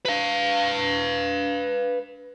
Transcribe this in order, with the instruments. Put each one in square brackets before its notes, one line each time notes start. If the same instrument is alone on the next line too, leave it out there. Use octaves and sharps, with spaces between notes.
[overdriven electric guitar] B4 F5